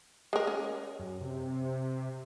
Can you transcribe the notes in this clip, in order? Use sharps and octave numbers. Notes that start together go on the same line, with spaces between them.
G#3 A#4
C#4
F#2
C3